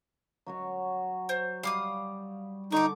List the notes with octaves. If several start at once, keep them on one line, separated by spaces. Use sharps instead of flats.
F#3 F#4 C#5
C5
G3 F5 D6 D#6
D3 D#4 C#6 D6